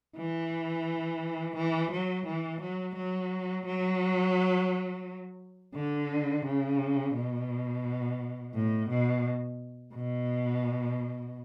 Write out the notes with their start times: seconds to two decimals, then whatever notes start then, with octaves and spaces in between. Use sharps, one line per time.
0.17 E3
1.56 E3
1.92 F#3
2.26 E3
2.62 F#3
2.95 F#3
3.66 F#3
5.75 D3
6.46 C#3
7.15 B2
8.55 A2
8.90 B2
9.94 B2